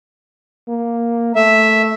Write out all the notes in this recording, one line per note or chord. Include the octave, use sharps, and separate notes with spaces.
A#3
A3 E5